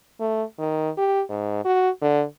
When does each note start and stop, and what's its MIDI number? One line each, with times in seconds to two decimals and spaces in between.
0.20 0.43 57
0.58 0.90 51
0.97 1.22 67
1.30 1.61 44
1.65 1.90 66
2.02 2.23 50